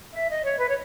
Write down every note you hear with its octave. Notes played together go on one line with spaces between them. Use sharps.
E5
D#5
C#5
B4
C#5